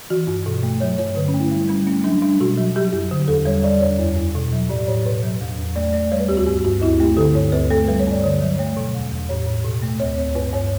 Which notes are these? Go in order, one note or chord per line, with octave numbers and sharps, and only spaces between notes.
E3 F#4
G2
B2
A3
F#3 C#5
G2 C#5
D3 B4
C#4
A3
E4
G3
G3 C#4
A3 C#4
F#3 D4
G3 D4
B2 F#4
F#3
F#3 G4
F#2
D3
E2 A4
G3 C#5
G3 D5
E2 C#5
F#2
F#2
B2
F#3
A2 D5
A2 C#5
B2 B4
F#3
E2
E2
A3 D5
A3 D5
G3 C#5
B4
D2 G4
F#4
G2 G4
G2 F#4
D2 E4
A3 G4
D3 A4
G2 C#5
D2 B4
A3 A4
G3 B4
C#5
G2 D5
D3 C#5
F#3
A3 C#5
B2
E2
E2
A2 C#5
A2
B2
A3
D2 C#5
D2 C#5
G2 B4
G2 C#5